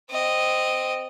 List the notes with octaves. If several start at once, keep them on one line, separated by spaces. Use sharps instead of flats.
C4 D#5